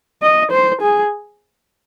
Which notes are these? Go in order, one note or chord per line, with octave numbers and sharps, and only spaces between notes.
D#5
C5
G#4